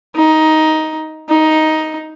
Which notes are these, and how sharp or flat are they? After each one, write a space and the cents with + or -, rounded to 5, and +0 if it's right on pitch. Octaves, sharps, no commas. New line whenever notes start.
D#4 +10
D#4 +10